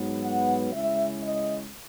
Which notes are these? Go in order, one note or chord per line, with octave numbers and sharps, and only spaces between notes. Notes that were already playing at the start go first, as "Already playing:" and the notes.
Already playing: G#2 F#3 B3
F#5
C#3 G#3 C#4 E4 E5
D#5